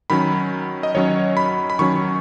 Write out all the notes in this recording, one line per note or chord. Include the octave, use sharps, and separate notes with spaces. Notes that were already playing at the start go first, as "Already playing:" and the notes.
D#3 F#3 C#4 B5
D#5
D#3 F#3 C#4 C#5
B5
B5
D#3 F#3 C#4 C#6